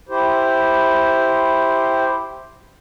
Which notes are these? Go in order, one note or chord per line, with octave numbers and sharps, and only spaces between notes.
E4 G4 C5